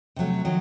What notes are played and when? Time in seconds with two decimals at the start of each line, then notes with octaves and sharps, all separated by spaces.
0.16 C3 F#3 A3
0.45 D#3 F#3